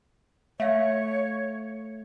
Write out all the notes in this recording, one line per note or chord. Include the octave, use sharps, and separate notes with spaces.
A3 C#5 E5 F5